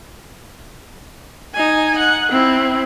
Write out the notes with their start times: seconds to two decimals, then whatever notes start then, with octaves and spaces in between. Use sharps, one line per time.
1.55 D#4 G#5
1.98 F#5
2.31 C4 E4